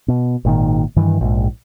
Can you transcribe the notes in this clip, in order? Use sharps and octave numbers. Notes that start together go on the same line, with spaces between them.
B2
G#1 A#2 D#3
G2 D#3 E3
A#1 G#2